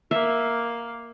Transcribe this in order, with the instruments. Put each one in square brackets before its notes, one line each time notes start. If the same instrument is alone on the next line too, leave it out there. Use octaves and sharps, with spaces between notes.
[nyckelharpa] A#3 F5 [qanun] E5